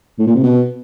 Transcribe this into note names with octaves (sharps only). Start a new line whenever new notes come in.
A2
A#2
C3
B2